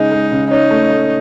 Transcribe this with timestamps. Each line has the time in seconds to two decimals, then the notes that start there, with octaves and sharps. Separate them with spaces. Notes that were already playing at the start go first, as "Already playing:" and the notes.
Already playing: C#3 G#3 D#4
0.12 G#3
0.32 C#3
0.51 C#4 D#4
0.71 A3
0.90 A3